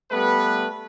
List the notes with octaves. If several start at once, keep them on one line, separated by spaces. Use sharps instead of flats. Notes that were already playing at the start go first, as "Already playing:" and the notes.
G3 A3 B3 B4